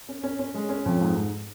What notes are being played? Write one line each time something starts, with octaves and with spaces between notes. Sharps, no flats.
C#4
C#4
C#4
G#3
C#4
F2
G#2
G#2